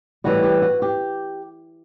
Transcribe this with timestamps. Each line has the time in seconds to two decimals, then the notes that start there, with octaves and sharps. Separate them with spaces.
0.24 A2 E3 G3 F#4
0.43 G4
0.62 F#4
0.82 G4